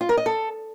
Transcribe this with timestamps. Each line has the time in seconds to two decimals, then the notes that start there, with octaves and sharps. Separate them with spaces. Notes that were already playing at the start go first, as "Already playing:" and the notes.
0.01 F4
0.09 A#4
0.17 D#5
0.26 A4